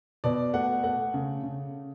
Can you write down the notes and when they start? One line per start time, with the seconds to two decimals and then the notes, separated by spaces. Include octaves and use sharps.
0.24 B2 D5
0.54 A3 F#5
0.84 A3 F#5
1.14 C#3
1.43 C#3